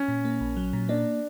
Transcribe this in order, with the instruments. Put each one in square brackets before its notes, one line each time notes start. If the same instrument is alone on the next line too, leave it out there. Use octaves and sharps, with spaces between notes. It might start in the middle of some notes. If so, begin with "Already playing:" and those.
Already playing: [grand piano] C#4
[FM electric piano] A#2
A#3
A#1
F#3
A#2
[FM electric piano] A#3 [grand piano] D4